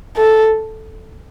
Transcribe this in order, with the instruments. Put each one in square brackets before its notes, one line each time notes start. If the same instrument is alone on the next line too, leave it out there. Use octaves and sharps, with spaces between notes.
[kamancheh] A4